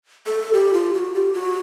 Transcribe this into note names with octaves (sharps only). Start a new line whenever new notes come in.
A4
G4
F4
G4
F#4
G4
F#4